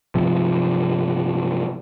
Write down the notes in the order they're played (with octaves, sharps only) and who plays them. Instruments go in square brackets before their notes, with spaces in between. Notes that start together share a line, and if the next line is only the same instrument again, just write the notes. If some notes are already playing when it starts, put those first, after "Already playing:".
[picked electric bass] G2 C3 F3